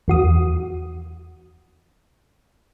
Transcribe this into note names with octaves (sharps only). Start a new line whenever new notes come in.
E2 F#4 D#6